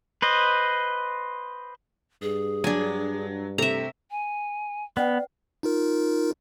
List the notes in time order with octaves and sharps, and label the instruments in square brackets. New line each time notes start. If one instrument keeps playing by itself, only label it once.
[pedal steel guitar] B4 C5 D#5
[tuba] G2 [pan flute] G#4
[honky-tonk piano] F#3 [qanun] D4 G#5
[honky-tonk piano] C3 A3 [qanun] E5 A#5
[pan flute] G#5
[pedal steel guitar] B3 [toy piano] C#4 B4 F#5 [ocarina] D5
[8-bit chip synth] D#4 F4 A#4